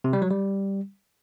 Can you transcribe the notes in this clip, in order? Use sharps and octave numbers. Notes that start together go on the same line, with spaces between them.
C3
G3
F#3
G3